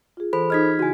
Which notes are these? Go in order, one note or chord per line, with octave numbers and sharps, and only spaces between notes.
F4 G#4
E3 A4 C5 B5
D#4 G#4 D#5 F6 G#6 B6
C#3 E4 F#4 G#5